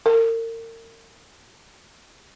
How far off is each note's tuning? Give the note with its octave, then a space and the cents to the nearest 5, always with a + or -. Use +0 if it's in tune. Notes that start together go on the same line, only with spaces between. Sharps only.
A#4 -35